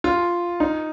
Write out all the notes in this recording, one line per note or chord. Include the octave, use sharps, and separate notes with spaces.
F4
D#4